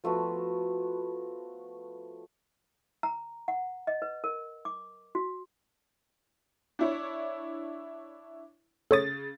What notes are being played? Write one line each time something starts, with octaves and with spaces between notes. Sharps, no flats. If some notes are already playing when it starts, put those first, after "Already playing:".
F3 A3 B3 F#4
A#5
F#5
D#5
B4
A#4
D6
F#4
D4 E4 C#5
C#3 A4 C#5 D#6 A6